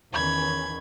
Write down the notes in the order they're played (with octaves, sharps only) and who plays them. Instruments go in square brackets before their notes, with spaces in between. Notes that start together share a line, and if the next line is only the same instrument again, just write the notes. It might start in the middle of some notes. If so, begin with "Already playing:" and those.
[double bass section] E2 D#3 C#4 [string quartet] B5 G#6